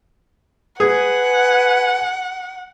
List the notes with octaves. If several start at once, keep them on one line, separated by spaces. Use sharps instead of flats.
G#4 B4 F#5 G#5